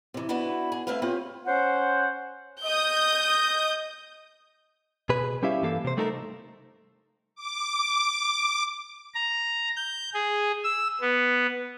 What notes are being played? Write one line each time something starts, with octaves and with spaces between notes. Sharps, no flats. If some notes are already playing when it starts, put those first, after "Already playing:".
C3 E3
B3 D4 E4 F#4 B4
G#4
A3 C4 E4 B4 F5
C4 F4 G4 G#4 B4 C#5
C#4 C5 F#5
D#5 D#6 G6
B2 G#4 B4
G3 C#4 E4 G4 E5 F5
G2 E3 A#3 G4 A4 F5
C3 C5
G3 A3 D#4 E4 A4 A#4
D6
A#5
G6
G#4
E6
B3